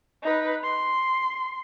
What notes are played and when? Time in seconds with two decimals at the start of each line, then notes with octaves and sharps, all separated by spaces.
0.22 D#4 B4
0.63 C6